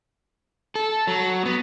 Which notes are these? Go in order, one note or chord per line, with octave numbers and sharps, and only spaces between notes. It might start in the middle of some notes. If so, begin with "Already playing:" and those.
A4
F#3
B3